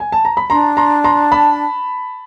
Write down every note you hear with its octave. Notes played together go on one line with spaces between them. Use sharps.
G#5
A5
A#5
B5
D4 A#5 C6
A#5 C6
A#5 C6
A5 B5